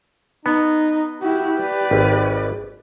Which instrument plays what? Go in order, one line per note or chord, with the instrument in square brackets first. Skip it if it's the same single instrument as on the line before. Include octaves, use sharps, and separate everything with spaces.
[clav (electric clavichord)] B3 [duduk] D#4
[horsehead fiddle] E4 F#4 [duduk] G4
[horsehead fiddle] B4 D5
[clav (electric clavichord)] G#1